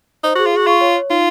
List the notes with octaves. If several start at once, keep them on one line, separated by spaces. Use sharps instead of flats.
D#4 C5
F#4
G#4
F4
F#4 G#4
F4 C#6
C#5
C#5
D#4 F4